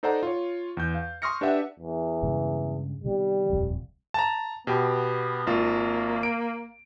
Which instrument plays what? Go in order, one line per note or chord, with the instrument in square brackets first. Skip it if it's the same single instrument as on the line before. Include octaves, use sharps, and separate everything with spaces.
[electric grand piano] D#4 A4 C5 D5 F#5 A#5
F4 C#5
E2 G6
F5
C6 C#6 D#6 F6 A#6 C#7
D4 G4 B4 D5 E5 F#5
[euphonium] E2
[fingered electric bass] G2 C#3 G#3
[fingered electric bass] C3 D#3 B3 [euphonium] G3
[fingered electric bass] D#1 C2 F2
[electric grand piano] A5 A#5
[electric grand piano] B2 G4 [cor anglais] B3
[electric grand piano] G#1 F4 [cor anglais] A#3
[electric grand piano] D7